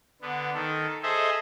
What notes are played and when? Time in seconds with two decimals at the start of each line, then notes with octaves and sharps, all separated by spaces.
0.22 D3 B3
0.54 D#3 A4
1.03 G#4 A4 C5 D#5 E5